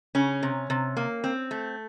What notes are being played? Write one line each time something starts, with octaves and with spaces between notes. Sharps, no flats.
C#3 C#4
C3
C3
A#3
C4
A3